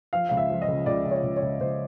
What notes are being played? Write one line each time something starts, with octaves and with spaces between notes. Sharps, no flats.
F3 F5
C#2 F5
E5
F3
D#5
C#3
C#2 D5
C#2
C#5
C#2
C#5
C#2
C#2 C5